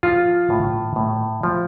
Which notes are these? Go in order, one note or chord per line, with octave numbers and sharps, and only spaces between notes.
F3 F4
A2
A2
F3